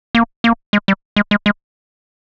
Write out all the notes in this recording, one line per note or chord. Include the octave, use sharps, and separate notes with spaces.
A#3
A#3
G#3
G3
G#3
G#3
G#3